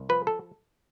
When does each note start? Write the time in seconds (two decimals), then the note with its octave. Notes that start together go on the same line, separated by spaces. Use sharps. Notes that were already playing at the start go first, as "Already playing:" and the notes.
Already playing: C2
0.09 F3 B4
0.27 A4